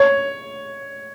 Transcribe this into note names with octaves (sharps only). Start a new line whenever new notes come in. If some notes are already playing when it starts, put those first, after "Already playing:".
Already playing: C#5